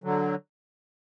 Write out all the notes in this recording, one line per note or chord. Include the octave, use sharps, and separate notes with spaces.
D3 F#3